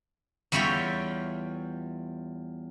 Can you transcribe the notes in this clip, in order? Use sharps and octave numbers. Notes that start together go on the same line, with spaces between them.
E2 G3 F4 C#5 E5 G5